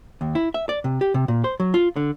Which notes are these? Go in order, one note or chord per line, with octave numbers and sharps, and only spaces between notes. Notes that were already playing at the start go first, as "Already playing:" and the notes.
D#2
E4
E5
D5
C3
G4
C3
A#2
C5
F#3
F4
D3